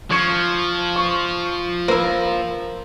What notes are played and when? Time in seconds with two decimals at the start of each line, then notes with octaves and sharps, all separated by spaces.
0.11 F3 C#6 G#6 C#7
0.96 C#6
1.88 A#3 E4 C5